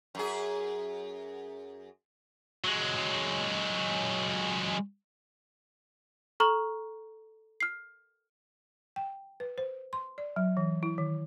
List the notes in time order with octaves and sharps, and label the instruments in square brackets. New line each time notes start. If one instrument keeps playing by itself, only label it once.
[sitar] F#2 G#4
[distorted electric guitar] F#3 G#3
[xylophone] A4 A#5 C#6 F6 F#7
F6 C7
[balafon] G5
B4
C5
C6
D5
F#3
E3
E4
D#3